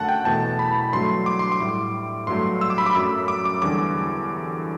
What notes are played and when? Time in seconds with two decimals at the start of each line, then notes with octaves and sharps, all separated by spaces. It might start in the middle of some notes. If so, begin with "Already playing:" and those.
Already playing: F#2 D3 A3 F#5 A5
0.09 G5
0.25 E2 B2 A3 A5
0.59 B5
0.93 G2 F#3 A3 C6
1.26 D6
1.39 C6
1.52 D6
1.60 A2 G3
2.27 G2 F#3 A3 C6
2.61 E6
2.70 D6
2.78 B5
2.86 D6
2.95 F#2 F#3 A3 E6
3.28 D6
3.45 D6
3.62 E2 D3 G3 D6